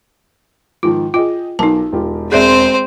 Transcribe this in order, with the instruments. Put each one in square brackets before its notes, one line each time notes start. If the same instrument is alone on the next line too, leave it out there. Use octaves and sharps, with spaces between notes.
[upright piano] G#2 D#3 F3 [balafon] F4
[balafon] F4 [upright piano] G#4 D#5 G5
[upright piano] B1 A#4 D6 [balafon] D#4 A5
[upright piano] E1 F4 G4
[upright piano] E1 G6 [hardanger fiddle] C4 C5 [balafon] G#4 D5 E5